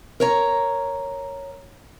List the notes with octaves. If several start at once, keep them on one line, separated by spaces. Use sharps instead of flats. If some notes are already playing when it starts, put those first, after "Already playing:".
A#4 C#5 A#5